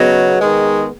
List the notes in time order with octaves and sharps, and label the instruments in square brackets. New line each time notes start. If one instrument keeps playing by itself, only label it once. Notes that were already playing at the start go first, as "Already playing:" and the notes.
Already playing: [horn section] C#3 F#3 [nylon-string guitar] B3 G#4 D#5
[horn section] D#3 G#3